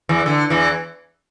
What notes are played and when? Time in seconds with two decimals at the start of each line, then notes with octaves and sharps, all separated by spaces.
0.09 E2 E3
0.26 D3
0.50 E2 E3